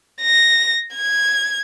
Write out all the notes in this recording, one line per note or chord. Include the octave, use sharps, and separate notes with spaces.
A#6
G#6